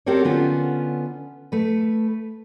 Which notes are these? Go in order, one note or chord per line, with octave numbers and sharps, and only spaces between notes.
C4 G4 A4 A#4 C#5
D3 B3 C#4 F4
A3 B4